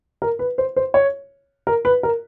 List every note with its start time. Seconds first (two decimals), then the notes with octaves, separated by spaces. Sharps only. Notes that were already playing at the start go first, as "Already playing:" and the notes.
0.22 A#4
0.39 B4
0.58 C5
0.76 C5
0.94 C#5
1.67 A#4
1.85 B4
2.03 A#4